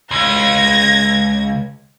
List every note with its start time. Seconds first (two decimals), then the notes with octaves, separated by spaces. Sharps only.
0.11 C#2 G#6 A#6